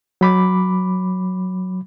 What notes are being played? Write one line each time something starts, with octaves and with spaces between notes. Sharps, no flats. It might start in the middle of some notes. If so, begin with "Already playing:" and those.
F#3 B5 D6